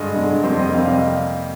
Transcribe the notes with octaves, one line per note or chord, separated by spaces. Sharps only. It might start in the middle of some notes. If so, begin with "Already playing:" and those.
Already playing: G2 D3 G#3 D#5
G2 D3 G#3
F2 C3 G3 A#3 C5
D#5
F2 C3 G3 A#3 F5
F5
D#5